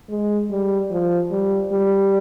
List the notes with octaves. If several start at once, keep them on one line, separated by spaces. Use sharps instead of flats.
G#3
G3
F3
G3
G3